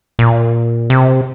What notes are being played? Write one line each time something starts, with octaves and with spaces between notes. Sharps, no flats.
A#2
C3